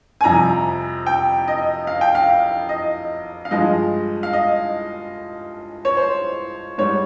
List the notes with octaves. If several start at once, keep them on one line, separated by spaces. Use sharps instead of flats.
G#5
F2 C3 G3 A#5
G5
D#5
F5
G5
F5
D#5
F5
G2 F3 G#3 D#5
F5
D#5
C#5
C5
G#2 G3 C#5